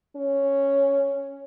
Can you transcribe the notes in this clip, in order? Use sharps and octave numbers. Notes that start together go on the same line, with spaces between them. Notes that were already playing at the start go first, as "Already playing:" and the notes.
C#4